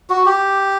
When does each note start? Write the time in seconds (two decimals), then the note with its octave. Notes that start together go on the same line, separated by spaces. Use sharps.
0.10 F#4
0.26 G4